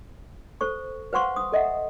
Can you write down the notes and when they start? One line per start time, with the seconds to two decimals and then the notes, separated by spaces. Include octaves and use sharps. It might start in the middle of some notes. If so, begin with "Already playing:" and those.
0.61 A4 C5 C#6
1.13 B4 C5 F5 F#5 C6 C#6
1.36 D#6
1.52 A4 D#5 E5 F#5